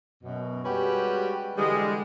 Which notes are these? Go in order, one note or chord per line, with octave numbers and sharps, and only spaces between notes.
F#2 B2
G3 G#3 C#4 F#4 G4 B4
D3 E3 G3 G#3